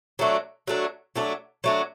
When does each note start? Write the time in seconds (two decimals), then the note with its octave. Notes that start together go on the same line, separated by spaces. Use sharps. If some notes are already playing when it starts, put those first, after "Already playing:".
0.19 F#3 A3 D4
0.67 F#3 A3 D4
1.16 F#3 A3 D4
1.64 F#3 A3 D4